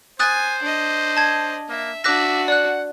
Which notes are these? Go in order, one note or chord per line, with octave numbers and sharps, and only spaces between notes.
C5 G#5 D#6 F#6 A6
D4 D#5
A5 G#6
A#3 E5
D4 F#4 E5 D6 F#6 A#6
D5 F#5 F#6